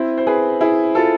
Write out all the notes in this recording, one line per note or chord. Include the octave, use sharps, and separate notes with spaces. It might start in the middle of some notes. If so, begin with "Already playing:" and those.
Already playing: C4 E4
C5
G#4 B4
E4 G#4
F4 A4